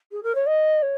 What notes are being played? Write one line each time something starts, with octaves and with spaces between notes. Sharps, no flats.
G#4
A#4
C#5
D#5
C#5